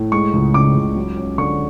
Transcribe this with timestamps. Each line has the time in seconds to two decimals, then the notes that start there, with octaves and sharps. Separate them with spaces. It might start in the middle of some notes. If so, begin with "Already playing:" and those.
Already playing: A2
0.12 G#3 C#6
0.33 C#2
0.54 C#3 D6
0.75 C#2
0.96 F#3
1.17 C#4
1.38 D3 C#6